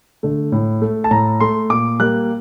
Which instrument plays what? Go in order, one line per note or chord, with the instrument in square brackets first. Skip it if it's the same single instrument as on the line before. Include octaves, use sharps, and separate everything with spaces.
[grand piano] D3 A3
A2
A3
A5
A2 A#5
A3 C6
A#2 D6
G3 A#3 F#6